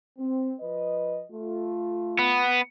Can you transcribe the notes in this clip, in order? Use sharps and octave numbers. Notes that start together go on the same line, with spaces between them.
C4
F3 B4 D#5
A3 F4
B3